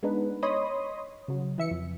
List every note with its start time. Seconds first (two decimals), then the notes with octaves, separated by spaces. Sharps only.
0.03 G#3 B3 D4 D#4 B4
0.43 C#5 D#5 B5 C6 D#6
1.28 C#3 F#3
1.58 E3 E5 C#7
1.71 F2